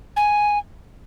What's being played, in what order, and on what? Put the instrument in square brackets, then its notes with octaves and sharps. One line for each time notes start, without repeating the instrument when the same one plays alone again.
[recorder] G#5